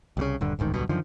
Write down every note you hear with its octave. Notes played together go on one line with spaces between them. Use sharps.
C2 A#2 C#3
D#1 G2 D3
D1 A1 G#2 D#3
D1 B1 G2 B2
F#2 D3 D#3 F3